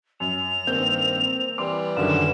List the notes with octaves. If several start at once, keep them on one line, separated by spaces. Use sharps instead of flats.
F#2 F7
G2 D#3 A#3 C4 G6
E3 G3 C6 D6
F#2 D3 D#3 E7